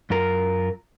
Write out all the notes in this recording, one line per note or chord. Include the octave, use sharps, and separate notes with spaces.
F#2 F4 A#4